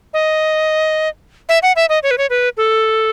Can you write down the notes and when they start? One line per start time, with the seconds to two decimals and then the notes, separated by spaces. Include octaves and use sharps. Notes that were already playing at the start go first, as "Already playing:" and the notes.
0.14 D#5
1.49 E5
1.63 F#5
1.76 E5
1.89 D#5
2.03 C#5
2.11 B4
2.18 C#5
2.30 B4
2.57 A4